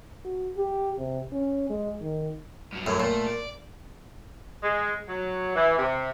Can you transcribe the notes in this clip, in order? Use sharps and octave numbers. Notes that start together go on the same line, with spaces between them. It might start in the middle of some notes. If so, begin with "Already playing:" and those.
F#4
G4
C3
C#4
G#3
D#3
G2 F#3
F#2 A2
A#2 A3
D5
G#3
F#3
E3
C3